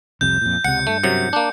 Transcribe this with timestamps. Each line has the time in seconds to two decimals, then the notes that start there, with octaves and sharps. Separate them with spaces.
0.21 C2 F2 C3 G6
0.41 F2 A#2
0.64 C#2 C3 F#5 C#7
0.87 G2 A3
1.03 F#2 C3 F#3 C#7
1.33 A#3 D4